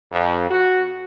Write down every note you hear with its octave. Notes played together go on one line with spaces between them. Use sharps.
F2
F#4